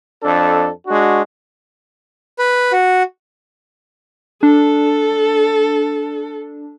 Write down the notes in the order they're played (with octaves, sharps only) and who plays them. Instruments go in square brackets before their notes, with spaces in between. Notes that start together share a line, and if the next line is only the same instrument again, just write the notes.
[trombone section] F2 D4 A4
G#3 D4 F#4
[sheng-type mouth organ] B4
F#4
[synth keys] D4 [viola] A4